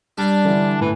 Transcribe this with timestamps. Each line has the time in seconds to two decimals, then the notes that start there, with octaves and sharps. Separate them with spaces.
0.18 G3 D4
0.45 D3 E3
0.81 A2 E3